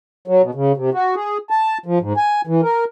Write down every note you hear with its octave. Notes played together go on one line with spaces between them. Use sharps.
F#3
B2
C#3
C3
F#4
G#4
A5
F3
G#2
G#5
E3
A#4